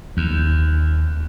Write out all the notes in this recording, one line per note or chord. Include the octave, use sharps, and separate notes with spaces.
D#2